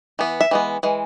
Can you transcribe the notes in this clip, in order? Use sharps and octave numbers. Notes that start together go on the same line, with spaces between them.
E3 B3
E5
E3 G#3 B3
E3 G#3